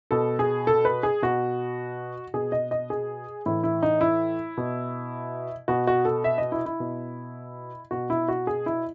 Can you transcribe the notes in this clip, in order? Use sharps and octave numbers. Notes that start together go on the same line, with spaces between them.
B2 A4
G#4
A4
B4
G#4
B2 F#4
B2 G#4
D#5
D#5
G#4
A2 E3 E4
E4
D#4
E4
B2
B2 F#4
F#4
A4
E5
D#5
E4
E4
B2
B2 F#4
E4
F#4
G#4
E4